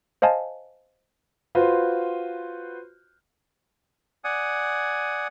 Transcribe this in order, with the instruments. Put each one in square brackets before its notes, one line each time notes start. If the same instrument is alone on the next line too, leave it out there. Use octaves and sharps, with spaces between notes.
[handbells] C5 D#5 F5 G#5 A5
[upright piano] F4 F#4 B4 C5
[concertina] D5 F#5 G#5 D#6